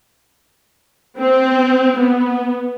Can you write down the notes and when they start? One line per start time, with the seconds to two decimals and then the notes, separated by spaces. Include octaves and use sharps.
1.19 C4
2.00 B3